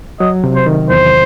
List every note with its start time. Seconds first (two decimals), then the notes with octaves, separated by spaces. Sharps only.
0.20 F#3 D#5
0.44 C3
0.56 C5
0.66 D#3
0.89 E2 C5